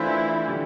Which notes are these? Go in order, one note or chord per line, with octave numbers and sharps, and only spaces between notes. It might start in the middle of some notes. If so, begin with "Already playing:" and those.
Already playing: E3 A3 D4 E4 F4 C5 F5
D3 G3